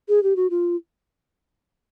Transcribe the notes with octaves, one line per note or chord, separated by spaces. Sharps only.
G#4
G4
F#4
F4